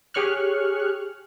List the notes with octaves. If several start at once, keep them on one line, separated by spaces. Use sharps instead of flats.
G4 G#4 C#5 C#6 F6 F#6